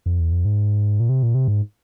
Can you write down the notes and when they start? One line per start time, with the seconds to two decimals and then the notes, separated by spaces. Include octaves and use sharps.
0.06 F2
0.20 E2
0.32 F2
0.45 G#2
1.00 A#2
1.09 C3
1.23 A#2
1.35 C3
1.48 G#2